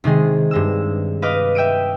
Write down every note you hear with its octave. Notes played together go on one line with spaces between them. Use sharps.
C3 D#3 G#3 G#4
G2 G#3 E6
B4 D#5 F5 D6
E5 G5 E6 D7 D#7